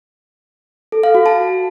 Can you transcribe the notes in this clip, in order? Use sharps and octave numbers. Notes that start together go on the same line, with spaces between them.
A4
F5
F#4
A5